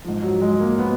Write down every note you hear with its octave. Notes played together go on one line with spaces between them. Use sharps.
G#2 F3
F#3
G#3
A#3
B3